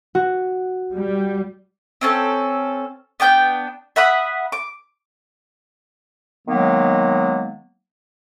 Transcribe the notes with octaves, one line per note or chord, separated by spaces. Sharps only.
F#4
G3
C4 C#4 A4
B3 D4 G5 G6
E5 F#5 B5 D#6
D6
D#3 F#3 G#3 A#3 B3